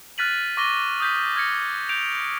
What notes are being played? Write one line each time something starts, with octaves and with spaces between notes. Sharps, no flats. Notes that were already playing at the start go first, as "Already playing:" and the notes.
F6 F#6 A6 B6 D#7 F#7
C#6 D6 A#6 D#7 G7
D#6 G6 B6
F6 G#6 A#6 C#7
G6 D7 F7